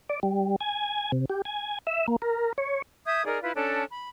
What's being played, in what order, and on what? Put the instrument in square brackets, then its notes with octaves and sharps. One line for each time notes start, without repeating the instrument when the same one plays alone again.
[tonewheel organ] D5
G3
G#5
C3
G4
G#5
E5
A#3
A#4
C#5
[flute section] E5 D#6 G6 G#6
D#4 G#4 A#4 D5
E4 F4 B4
C#4 D4 A4 A5
B5